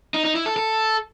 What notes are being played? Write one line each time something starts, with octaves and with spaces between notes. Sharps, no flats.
D#4
D#4
E4
A4
A4